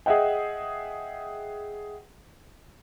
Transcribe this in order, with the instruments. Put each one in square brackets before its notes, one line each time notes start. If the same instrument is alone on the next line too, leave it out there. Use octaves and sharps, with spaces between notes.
[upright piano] G#4 D#5 E5 F#5 G5